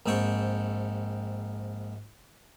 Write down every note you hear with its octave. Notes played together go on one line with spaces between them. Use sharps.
A#1 G#2 C4 G5 C#6